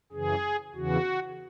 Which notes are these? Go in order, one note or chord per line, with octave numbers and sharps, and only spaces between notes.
F#2 C#3 E3 G#4
E2 C#3 E3 F#4